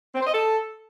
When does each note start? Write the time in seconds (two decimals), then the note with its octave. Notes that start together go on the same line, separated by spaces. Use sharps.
0.15 C4
0.21 C5
0.27 D#5
0.33 A4